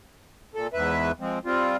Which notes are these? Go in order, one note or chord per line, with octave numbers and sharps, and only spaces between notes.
A#2 A4
E2 G#2 B4 E5
F3 G#3 C4
G3 C4 F4